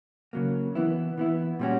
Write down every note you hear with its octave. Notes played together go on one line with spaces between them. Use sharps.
C#3 F#3 A#3
E3 B3 E4
E3 B3 E4
A#2 G3 C#4 F#4